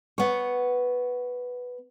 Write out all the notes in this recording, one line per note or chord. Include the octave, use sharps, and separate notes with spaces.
B3 C#5